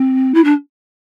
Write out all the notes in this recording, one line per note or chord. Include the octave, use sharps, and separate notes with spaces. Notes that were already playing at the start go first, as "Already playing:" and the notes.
Already playing: C4
E4
D4